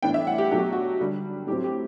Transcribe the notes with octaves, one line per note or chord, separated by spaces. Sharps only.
A2 E3 B3 D4 G5
E5
F#5
G4
B2 F#3 A3 D4 G4
F#4
F#4
D3 G3 D4
A2 F#3 C4 G4
G4